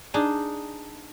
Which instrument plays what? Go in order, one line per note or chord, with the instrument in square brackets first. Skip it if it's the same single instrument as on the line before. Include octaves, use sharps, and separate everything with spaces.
[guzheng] D4 D#4 G#4 D#5 A5